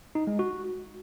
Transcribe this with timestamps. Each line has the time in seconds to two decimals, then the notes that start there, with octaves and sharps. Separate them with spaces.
0.15 D#4
0.27 G#3
0.39 F#4